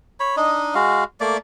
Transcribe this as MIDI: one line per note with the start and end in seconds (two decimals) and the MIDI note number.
0.20 0.36 73
0.20 0.36 83
0.37 0.74 62
0.37 0.74 63
0.37 0.74 75
0.75 1.04 56
0.75 1.04 66
0.75 1.04 77
1.20 1.37 57
1.20 1.37 58
1.20 1.37 74